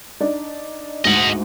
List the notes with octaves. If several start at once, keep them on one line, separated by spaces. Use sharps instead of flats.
D4 D#4 D5
D2 G#2 D#5 F#5